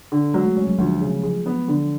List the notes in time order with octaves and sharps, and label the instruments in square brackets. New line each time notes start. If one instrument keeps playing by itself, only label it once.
[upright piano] D3
[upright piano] F#3 [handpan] G#3
[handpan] A3
[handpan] G#3 [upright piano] C#4
[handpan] F#3
[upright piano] D2 [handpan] F3
[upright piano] C#3
[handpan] F3 [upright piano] G#3
[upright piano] B3
D3